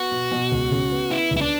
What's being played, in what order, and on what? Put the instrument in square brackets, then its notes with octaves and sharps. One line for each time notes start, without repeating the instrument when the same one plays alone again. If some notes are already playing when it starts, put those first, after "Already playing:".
Already playing: [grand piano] B3 [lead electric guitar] F#4
[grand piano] B2
B2
C#2
C#3
B3
[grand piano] B3 [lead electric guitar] E4
[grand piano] C#2
[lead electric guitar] E4
D4